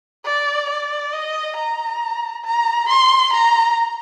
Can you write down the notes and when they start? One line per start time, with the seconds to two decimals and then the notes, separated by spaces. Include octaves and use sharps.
0.25 D5
0.70 D5
1.13 D#5
1.56 A#5
2.44 A#5
2.88 C6
3.33 A#5